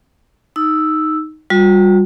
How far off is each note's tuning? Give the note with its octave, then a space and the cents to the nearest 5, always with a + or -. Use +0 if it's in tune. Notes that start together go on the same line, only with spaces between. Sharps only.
D#4 +0 E6 +0
G3 +0 F#4 -45